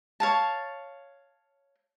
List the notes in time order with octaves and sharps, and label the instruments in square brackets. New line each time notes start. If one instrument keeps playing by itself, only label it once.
[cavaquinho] C#5 F5 A5